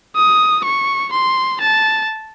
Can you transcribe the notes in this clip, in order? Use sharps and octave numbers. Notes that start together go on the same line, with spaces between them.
D#6
C#6
C6
A5